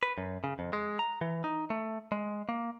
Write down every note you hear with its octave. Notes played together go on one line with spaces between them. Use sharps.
B4
F#2
C#3
F2
G#3
A#5
E3
D#4
A3
G#3
A#3